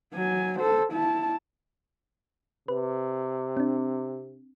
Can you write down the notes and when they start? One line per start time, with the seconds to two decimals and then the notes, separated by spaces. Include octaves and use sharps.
0.14 F#3 G#5
0.60 A4 C5
0.93 E4 A5
2.68 C3 B4
3.57 C4 D4